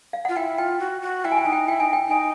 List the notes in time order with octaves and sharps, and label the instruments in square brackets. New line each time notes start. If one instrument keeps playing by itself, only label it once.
[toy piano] F5
[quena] F4 [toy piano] F#5
[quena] E4 [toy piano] G5
[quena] F4 [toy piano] G5
[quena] F#4
F#4
[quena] E4 [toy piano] G5
[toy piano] G#5
G5
[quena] D#4 [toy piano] G#5
[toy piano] G5
[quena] E4 [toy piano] G5
[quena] D#4 [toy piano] G#5
[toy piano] G5
[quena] D#4 [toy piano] G#5